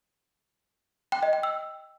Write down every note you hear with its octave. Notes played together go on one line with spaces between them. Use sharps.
G5
D#5
G5
E6